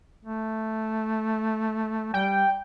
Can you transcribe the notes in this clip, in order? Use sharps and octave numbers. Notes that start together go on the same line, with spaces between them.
A3
G3 G5